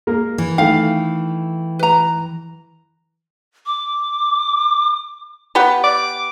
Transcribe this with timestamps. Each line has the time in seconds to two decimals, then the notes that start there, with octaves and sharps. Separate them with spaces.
0.07 G#3 A#3 A#4
0.38 E3
0.58 D#3 A3 F5 G5
1.79 B4 A#5
3.66 D6
5.55 B3 G4 B4
5.84 D6